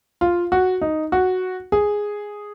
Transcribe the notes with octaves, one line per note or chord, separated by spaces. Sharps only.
F4
F#4
D#4
F#4
G#4